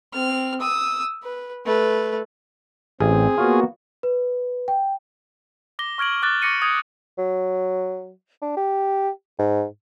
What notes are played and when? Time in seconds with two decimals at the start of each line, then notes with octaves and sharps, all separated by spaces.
0.13 C4 F6
0.60 D#6 E6
1.24 B4
1.65 A3 B4
3.00 A1 C4 G#4
3.38 A#3 B3 F4 F#4 C#5
4.03 B4
4.68 G5
5.79 D6 A#6 G7
5.98 C#6 F6 G#6 D7 F#7
6.22 D6 F#6 A6 G7
6.42 C#6 D6 A#6 C#7 D#7
6.62 D#6 G#6 C#7
7.18 F#3
8.42 D4
8.57 G4
9.39 G#2